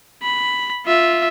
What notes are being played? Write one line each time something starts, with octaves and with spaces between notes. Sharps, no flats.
B5
F4 E5